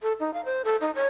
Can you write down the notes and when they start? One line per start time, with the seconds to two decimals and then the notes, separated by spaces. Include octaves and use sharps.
0.02 A4
0.20 D#4
0.34 F5
0.45 C5
0.65 A4
0.81 D#4
0.95 C#5